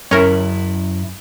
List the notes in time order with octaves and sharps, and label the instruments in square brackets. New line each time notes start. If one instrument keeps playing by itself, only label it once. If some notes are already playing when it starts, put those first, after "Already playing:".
[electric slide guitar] F#2 E4 [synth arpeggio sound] C#4 A#4